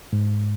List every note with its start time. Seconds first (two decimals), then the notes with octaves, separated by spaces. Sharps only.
0.13 G#2